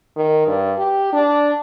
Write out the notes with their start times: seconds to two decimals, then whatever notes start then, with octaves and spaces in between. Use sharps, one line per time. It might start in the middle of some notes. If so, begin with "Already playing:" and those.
0.16 D#3
0.47 G2
0.78 G4
1.13 D4